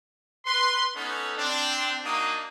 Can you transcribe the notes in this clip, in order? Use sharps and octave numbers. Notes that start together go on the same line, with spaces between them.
B4 C6
B3 C#4 D#4 A4
C4 D4
A#3 D4 D#4 F#4 D#6